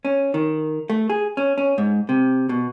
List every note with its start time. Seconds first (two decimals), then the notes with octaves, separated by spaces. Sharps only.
0.05 C#4
0.34 D#3
0.90 A3
1.10 G#4
1.37 C#4
1.58 C#4
1.78 G#2
2.09 C3
2.49 B2